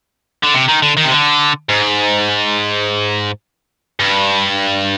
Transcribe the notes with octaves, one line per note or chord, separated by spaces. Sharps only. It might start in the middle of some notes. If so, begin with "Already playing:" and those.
D3
C3
D#3
D3
D#3
C3
D3
G#2
G2